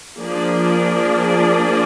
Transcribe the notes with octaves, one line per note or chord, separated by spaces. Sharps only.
F3 A#3 D4 G#4 D5